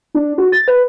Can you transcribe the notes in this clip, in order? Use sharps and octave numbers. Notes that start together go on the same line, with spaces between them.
D4
F#4
A6
B4